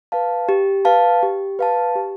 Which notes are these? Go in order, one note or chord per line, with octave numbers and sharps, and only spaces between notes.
B4 F5 A5
G4
B4 F5 A5
G4
B4 F5 A5
G4